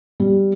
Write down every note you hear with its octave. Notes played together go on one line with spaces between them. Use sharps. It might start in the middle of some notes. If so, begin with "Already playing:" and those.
G3